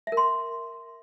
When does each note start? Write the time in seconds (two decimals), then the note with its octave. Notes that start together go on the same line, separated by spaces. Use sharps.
0.07 E5
0.12 A#4
0.17 C6